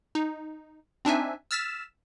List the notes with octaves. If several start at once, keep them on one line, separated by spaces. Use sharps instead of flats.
D#4
C4 D4 D#4 E5 G#5
E6 F6 A6 B6 E7